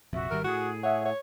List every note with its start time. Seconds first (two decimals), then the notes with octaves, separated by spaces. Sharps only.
0.13 F1 A#1 F2 F#4 E5
0.31 G#1 D#3 G3 A#4
0.44 A2 F#4 G#4
0.83 C#5 E5 F#5
1.05 C#5